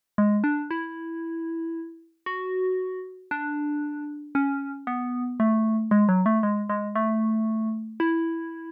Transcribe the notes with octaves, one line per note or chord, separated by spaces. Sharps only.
G#3
D4
E4
F#4
D4
C#4
B3
A3
G#3
F#3
A3
G#3
G#3
A3
E4